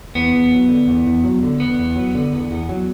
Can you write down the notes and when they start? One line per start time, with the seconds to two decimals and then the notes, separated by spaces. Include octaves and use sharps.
0.15 E2 B3
0.34 E2
0.52 F#3
0.69 D3
0.88 E2
1.06 E2
1.24 F#3
1.43 D3
1.60 E2 B3
1.78 E2
1.96 F#3
2.15 D3
2.33 E2
2.51 E2
2.69 F#3